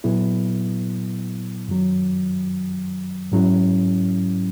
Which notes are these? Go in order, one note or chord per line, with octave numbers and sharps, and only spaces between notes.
A#2 F#3 B3 E4
F#2 D#3 F#3
G#2 F#3 C#4 E4